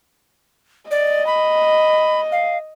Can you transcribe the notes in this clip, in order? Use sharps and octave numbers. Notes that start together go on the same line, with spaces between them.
D5 D#5
B5
F5